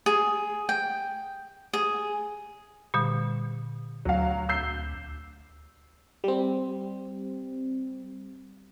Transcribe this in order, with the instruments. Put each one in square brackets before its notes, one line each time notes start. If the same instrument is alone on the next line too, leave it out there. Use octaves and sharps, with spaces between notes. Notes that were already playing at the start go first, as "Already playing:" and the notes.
[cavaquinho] G#4
G5
G#4
[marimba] A#2 D3 G3
[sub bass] D2 [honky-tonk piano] F#3 F5
[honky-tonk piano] E6 G6 C7
[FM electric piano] G3 C4